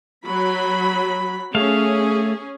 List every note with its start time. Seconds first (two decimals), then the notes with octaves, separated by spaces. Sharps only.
0.25 F#3 B5
1.55 A3 C#4 G#4 F5